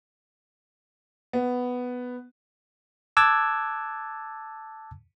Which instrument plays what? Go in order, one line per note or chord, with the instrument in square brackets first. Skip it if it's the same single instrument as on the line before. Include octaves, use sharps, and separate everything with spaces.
[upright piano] B3
[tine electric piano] A5 D6 E6 F#6 G#6 A6